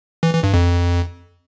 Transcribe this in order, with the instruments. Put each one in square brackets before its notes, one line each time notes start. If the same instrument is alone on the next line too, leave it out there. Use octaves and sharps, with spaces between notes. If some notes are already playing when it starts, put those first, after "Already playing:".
[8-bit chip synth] E3
E3
G2
F2